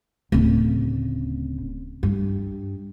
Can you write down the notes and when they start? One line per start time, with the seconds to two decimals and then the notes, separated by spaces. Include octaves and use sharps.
0.32 D1 C#3
2.03 G2